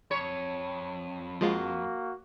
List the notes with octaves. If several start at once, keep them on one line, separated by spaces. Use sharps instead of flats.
F2 C#5
F3 G#3 A#3 F4 F#4